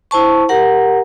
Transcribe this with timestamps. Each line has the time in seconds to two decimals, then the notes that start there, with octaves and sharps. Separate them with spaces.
0.11 E4 C5 A5 C#6
0.49 G4 A#4 F#5 A#5